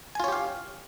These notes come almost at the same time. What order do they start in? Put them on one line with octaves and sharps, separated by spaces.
G#5 F4 C#5 G4 F5